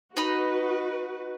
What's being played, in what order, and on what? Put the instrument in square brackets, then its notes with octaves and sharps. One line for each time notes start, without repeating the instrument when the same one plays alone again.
[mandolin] D#4 D#5 B5 [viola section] F#4 B4